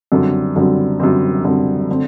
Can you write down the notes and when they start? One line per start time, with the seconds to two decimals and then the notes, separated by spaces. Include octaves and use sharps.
0.12 F#2 D3 G3 C4
0.56 F#2 D3 G3 C4
1.00 F#2 D3 G3 C4
1.44 F#2 D3 G3 C4
1.90 D3 A3 C4